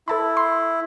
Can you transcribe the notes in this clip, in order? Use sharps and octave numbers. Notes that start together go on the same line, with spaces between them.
E4 A4 A5 B5
C6